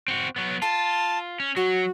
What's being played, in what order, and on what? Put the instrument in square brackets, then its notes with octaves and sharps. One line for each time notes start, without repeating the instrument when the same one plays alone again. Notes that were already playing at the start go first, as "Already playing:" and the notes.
[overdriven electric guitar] C4 F#4
F#3 B3
[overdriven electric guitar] F4 [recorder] A5
[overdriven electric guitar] C#4
[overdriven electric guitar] F#3 [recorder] F#4